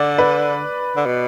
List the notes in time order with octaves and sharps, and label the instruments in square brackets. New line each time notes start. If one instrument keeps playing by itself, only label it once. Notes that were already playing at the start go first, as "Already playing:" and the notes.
Already playing: [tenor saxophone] D3 [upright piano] D5
[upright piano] B4
[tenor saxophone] D3
B2